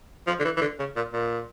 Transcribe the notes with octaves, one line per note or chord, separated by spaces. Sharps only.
F3
D3
E3
E3
D3
C#3
A#2
A#2